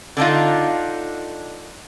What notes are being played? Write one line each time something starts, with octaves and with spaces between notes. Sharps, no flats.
D3 D4 D#4 F4